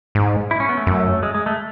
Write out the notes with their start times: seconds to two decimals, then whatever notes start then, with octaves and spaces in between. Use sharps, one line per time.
0.15 G#2
0.51 E4
0.60 C#4
0.69 B3
0.77 A3
0.87 F#2
1.23 G#3
1.35 G#3
1.46 A3